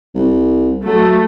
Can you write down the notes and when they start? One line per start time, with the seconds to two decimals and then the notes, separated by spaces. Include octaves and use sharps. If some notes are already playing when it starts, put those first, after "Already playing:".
0.15 C2
0.86 F#3 A3